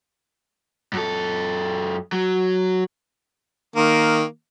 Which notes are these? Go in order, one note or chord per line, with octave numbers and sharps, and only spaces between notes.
F#2 A4
F#3
D#3 A#3